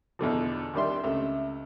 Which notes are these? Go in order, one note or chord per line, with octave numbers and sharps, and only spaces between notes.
E2 B2 D3 F3
C2 D#3 G3 D4 E5 C6
C#2 C3 A3 E5